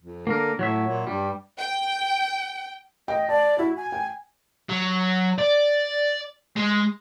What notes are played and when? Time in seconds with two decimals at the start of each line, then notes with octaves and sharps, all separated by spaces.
0.01 F2
0.27 D3 A#3 A#4
0.59 A2 F#3 C#5 E5
0.87 A#2
1.07 G2 G3
1.58 G5
3.08 D#5 G5
3.29 D5 A5
3.58 E4 F#4
3.77 G#5
3.92 G5
4.70 F#3
5.39 D5
6.57 G#3